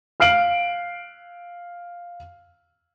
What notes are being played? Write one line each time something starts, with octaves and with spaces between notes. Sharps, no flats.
F5 F6 C7 D7 F#7